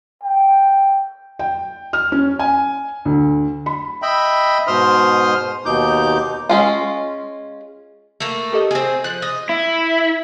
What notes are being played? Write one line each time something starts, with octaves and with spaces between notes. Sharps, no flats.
G5
G5
F6
C#4
G#5
D2
B5
D#5 E5 G5 B5
G#2 B2 C5 C6 D#6 F6
D#2 B2 D#4 D6 G6
G#3 C#4 F4
A3 A#3
G4 A4 D#5
C4 G#4
F3 F#6
D#5
E4